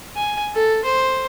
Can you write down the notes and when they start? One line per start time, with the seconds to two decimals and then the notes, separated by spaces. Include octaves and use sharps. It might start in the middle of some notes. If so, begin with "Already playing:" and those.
0.16 G#5
0.55 A4
0.85 C5